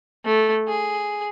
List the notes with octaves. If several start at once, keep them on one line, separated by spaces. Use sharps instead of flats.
A3
G#4